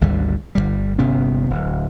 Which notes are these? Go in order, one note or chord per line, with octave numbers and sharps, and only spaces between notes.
G#1 D2 D3 G3
G1 C#2 G3
G1 C3 B3 C#4
D1